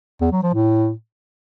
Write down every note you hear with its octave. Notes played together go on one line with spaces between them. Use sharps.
E2
F#3
F3
A2